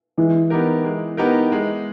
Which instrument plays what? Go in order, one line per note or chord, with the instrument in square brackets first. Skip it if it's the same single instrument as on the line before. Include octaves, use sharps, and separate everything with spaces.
[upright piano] E3 [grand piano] G#3
[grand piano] B3 D#4 G4 A#4
G#3
B3 D#4 G4 A#4
G#3